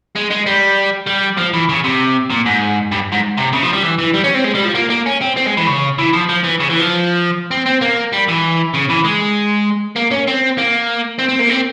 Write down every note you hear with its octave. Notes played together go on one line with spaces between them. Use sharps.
G#3
G#3
G3
G3
F3
E3
C#3
C3
A#2
G#2
G2
G#2
C3
C#3
F3
G3
E3
E3
G3
C#4
C4
G#3
G3
F3
A#3
A#3
C#4
C4
C4
G#3
E3
C#3
E3
F3
F3
E3
C#3
E3
F3
C4
C4
A#3
G3
E3
C#3
E3
G#3
A#3
C#4
C4
A#3
C4
C4
A#3
C4